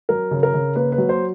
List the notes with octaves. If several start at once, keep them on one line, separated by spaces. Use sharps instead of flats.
F#3 A#4
C#3
A#4
C#3
A#3 B4
B4
F#3
C5